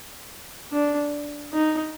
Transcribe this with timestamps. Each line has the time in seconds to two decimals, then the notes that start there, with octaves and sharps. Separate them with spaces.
0.72 D4
1.53 D#4